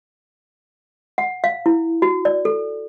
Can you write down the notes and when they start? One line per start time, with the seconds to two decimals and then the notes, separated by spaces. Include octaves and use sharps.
1.18 F#5
1.44 F5
1.66 E4
2.02 F#4
2.25 D5
2.45 A4